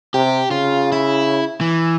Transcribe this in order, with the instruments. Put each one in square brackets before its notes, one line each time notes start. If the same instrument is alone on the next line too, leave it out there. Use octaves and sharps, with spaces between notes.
[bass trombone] C3 [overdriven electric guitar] G4
[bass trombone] C#3 [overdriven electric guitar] F4
[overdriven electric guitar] E4
E3